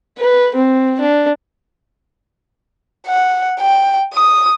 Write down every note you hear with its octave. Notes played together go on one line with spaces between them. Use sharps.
B4
C4
D4
F#5
G5
D#6